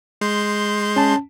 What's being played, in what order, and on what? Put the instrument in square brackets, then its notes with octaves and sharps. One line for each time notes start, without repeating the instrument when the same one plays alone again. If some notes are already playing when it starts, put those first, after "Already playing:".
[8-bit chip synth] G#3 C6 G6
[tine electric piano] C#4 A5